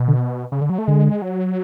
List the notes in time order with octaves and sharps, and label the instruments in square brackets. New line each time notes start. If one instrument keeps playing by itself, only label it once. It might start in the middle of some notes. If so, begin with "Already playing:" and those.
Already playing: [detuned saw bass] B2
[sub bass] D3
[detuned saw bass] C#3
D3
F#3
A3
[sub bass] D3 [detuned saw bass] G#3
[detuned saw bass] F#3